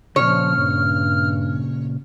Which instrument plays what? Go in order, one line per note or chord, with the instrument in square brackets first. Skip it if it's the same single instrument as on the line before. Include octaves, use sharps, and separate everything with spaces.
[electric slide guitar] A#2 C#3 [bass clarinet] F3 [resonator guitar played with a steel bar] C#5 [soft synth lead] F6
[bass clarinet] G2